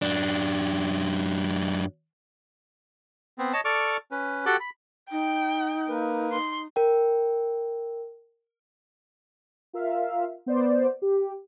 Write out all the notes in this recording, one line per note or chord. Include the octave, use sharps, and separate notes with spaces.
F#2 D4
B3 C4
C#5 D#5 A5
A4 D5 C#6 D6 F6
C#4 B4
F#4 G4 A4 G5 D6 F#6
B5
D#4 G5
A#3 A#4 B4
D#4 C6
A#4 G5
F4 A#4 E5 F5
B3 C5 D5
G4